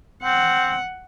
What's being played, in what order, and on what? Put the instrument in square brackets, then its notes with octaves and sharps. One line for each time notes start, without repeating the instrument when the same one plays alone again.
[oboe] C4 [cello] F#5